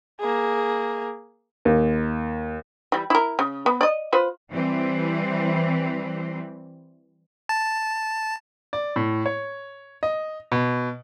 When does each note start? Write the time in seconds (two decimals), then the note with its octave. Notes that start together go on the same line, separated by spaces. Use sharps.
0.20 A#3 G#4
1.65 D#2
2.92 E3 G3
3.10 E4 A#4
3.39 C#3
3.66 B3
3.81 D5 D#5
4.13 F4 B4 C5
4.51 E3 G3 C4
7.49 A5
8.73 D5
8.96 A2
9.26 C#5
10.03 D#5
10.52 B2